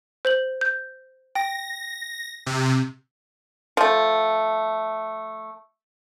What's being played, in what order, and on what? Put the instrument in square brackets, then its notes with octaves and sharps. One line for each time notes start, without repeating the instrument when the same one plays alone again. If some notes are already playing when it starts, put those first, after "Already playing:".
[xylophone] C5 G6 F#7
G6
[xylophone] G5 [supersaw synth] A#6
[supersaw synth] C3
[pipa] F3 A3